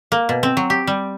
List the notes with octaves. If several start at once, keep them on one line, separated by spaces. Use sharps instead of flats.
A#3
B2
C4
F#3
G4
G3